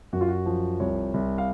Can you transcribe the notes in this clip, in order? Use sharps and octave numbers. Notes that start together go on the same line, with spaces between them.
F#2 F#4
F4
F#4
F3
C2 C#5
C2
F5